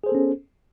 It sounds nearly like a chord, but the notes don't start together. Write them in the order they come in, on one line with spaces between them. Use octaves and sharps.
G#4 C5 A4 B3 C#4